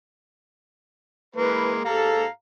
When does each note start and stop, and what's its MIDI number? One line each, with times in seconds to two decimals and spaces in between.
1.36 1.80 52
1.36 1.80 56
1.36 1.80 58
1.36 1.73 71
1.85 2.24 44
1.85 2.24 67
1.85 2.24 69
1.85 2.28 77
1.85 2.28 82